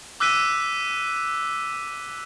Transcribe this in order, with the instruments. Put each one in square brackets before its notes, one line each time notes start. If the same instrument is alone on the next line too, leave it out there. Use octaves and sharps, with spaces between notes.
[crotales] D6 E6 F#6 B6 D#7